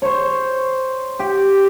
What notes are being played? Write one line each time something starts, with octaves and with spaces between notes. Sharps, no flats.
C5 C#5
G4